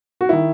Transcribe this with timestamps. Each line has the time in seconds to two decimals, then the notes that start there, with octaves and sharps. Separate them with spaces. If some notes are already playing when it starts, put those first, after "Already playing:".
0.21 F#4
0.29 D#3 E4